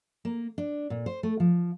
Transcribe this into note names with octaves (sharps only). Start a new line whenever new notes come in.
A#3
D4
A#2
C5
A3
F3